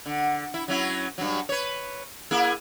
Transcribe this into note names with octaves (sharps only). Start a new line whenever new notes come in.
D3
E4
F#3 C#4 E4
G2 F#3
B4 C#5
A#3 E4 G#4